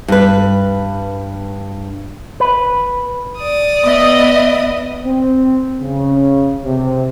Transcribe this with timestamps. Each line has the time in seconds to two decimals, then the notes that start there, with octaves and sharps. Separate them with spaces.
0.08 G2 B4
2.40 B4
3.38 D5 D#6
3.84 B3 D#5 E5
5.04 C4
5.80 C#3
6.65 C3